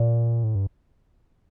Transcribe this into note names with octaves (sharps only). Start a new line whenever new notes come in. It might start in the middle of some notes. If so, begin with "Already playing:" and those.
Already playing: A#2
A2
G2